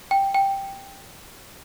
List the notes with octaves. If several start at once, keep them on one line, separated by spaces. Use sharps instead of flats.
G5
G5